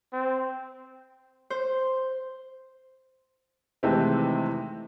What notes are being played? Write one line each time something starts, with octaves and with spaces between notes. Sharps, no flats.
C4
C5
C3 D#3 E3 G#3 A3 C4